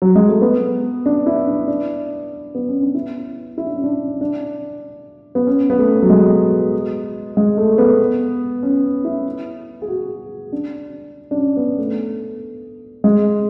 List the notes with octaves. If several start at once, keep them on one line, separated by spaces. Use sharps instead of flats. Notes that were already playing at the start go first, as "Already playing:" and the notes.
F#3
G#3
A3
B3
D4
E4
D4
D4
B3
C#4
D4
E4
E4
D4
C#4
D4
D4
B3
C#4
B3
A3
F#3
G#3
G#3
A3
B3
C#4
E4
G#4
F#4
D4
D4
C#4
B3
A3
G#3